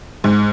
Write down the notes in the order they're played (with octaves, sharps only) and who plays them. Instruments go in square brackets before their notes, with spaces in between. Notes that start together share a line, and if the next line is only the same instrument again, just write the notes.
[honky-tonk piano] G#2